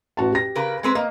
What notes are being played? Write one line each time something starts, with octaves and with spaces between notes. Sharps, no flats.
A1 F#4 A5
G4 A#6
C#3 A#4 B4
G#3 C4 B4
A#3 D#5